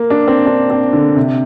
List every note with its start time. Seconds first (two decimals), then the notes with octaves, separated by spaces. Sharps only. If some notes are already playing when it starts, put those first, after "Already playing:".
Already playing: A#3
0.10 D4
0.28 C4
0.46 D4
0.70 C4
0.93 D3
1.16 C3